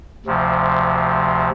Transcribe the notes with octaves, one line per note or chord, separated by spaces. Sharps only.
D2 C3 F3